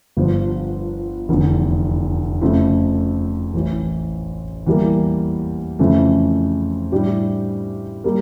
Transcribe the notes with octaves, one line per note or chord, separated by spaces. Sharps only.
G1 G2 F3
F1 E2 D3
F2 C#3 F3 A3
A1 A2 E3
E2 E3 G3 A#3
F2 C#3 E3 A3
A2 G3 D4 G4
G3 A#3